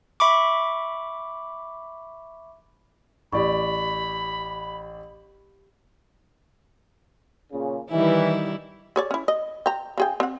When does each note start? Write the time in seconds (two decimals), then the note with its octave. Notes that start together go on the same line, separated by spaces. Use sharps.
0.20 E5 B5 C#6 D6
3.33 A1 G4 D5 B5 C#6
7.52 A#2 C#3
7.91 D#3 E3 G3 E4
8.96 G#4 C#5 D5
9.11 C#4 E4
9.28 D#5
9.66 G5 A#5
9.98 C#3 G#4 G5
10.20 C4 F#5